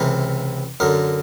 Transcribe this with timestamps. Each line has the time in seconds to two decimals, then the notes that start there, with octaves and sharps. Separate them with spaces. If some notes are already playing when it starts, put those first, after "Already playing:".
Already playing: C#2 C3 E3 A#4
0.80 F#2 D3 A#4